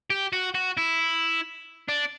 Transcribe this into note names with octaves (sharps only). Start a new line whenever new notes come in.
G4
F#4
F#4
E4
D4